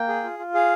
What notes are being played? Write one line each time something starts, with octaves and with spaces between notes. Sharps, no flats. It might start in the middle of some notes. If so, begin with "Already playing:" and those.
Already playing: A#3 G5
G#4
F4
F4
G#4 F5